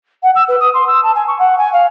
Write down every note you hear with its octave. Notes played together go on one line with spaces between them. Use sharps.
F#5
E6
B4
D#6
C6
E6
A5
G#5
C#6
F#5
G#5
F5